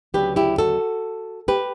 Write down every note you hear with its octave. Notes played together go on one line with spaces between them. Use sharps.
D2 C#3 F#3 B3 D4 G4 B4
E4 G4
F#4 A4
G4 B4